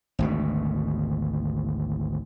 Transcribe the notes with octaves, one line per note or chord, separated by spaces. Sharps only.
G#1 D2 B2